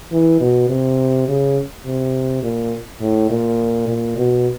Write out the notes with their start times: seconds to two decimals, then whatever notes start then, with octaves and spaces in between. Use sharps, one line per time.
0.12 E3
0.40 B2
0.69 C3
1.28 C#3
1.85 C3
2.43 A#2
3.00 A2
3.30 A#2
3.88 A#2
4.17 B2